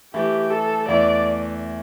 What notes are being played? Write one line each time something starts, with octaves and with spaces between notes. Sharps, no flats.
E3 A3 E4 G4
A4
E2 E3 A3 E4 D5